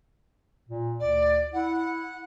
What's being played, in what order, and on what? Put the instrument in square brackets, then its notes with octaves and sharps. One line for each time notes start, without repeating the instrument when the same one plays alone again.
[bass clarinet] A#2
[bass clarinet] D2 [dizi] D5
[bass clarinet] E4 [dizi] F#5